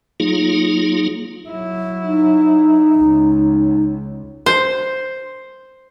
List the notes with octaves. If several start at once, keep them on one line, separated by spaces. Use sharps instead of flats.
F#3 A#3 D#4 F4 G#4
F#3 E4
D#4
C#2
C5